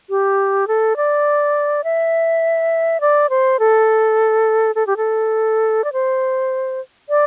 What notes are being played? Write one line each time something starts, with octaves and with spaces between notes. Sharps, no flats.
G4
A4
D5
E5
D5
C5
A4
A4
G4
A4
D5
C5
D5